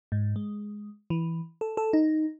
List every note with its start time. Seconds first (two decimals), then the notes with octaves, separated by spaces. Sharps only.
0.12 G#2
0.36 G#3
1.10 E3
1.61 A4
1.77 A4
1.93 D#4